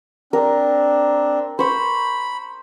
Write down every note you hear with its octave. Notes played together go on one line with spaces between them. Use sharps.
C4 D4 A#4
C5 B5 C#6